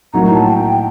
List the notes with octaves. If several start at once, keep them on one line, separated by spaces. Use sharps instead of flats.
A2 F#3 A#3 D#4 A#5
A#5
A5
G5